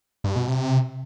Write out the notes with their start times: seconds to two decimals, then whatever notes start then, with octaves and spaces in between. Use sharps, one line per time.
0.24 G2
0.36 B2
0.48 C3